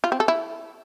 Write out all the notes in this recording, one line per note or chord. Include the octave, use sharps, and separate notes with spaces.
F4
C4
A4
E4